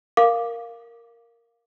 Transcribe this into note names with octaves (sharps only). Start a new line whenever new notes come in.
A#4 F5 D6